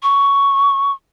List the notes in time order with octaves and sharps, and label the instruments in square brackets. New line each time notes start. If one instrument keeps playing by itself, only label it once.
[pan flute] C#6